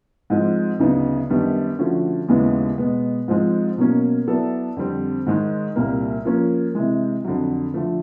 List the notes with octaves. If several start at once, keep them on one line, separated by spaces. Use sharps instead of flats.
G#2 F3 G#3 C4
D2 C#3 F#3 B3 D#4
F#2 D#3 G3 B3 D4
D3 F3 A3 C#4 F#4
D#2 C#3 E3 G#3 B3
B2 G#3 B3
G#2 F3 G#3 C4
B2 F#3 A#3 C#4
F#3 B3 E4 A4 D5
F2 D3 G3 C4
G#2 D#3 G#3
C2 A#2 G3 A#3
F3 A#3 C#4
C3 E3 G#3
F2 D3 F#3
D3 F3 A3